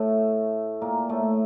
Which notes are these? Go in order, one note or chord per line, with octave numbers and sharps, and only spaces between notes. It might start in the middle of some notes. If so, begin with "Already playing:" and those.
Already playing: A2 A3
A#2 A#3
A2 A3